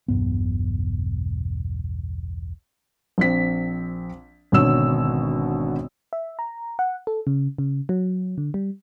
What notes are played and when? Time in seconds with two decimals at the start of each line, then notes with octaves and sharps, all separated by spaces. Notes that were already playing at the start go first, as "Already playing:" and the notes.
0.08 E1 B1 G2 B3
3.18 A#1 C4 B6
4.52 G#1 B2 D3 C#5 E6 E7
6.13 E5
6.39 A#5
6.79 F#5
7.07 A4
7.27 C#3
7.58 C#3
7.89 F#3
8.38 D3
8.54 G3